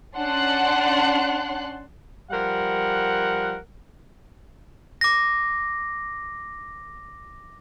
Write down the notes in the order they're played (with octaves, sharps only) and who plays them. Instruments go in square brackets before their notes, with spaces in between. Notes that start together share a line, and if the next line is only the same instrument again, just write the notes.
[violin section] C#4 D4 F#5 A5 C6 F#6
[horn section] F3 G3 A#4 F#5
[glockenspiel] D6 A#6